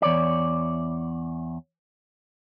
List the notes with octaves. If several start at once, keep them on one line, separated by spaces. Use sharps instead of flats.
E2 C#5 D5